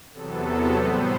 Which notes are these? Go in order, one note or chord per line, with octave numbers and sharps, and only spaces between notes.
E2 C3 F#3 B3 A4
A2 G3 B3 C5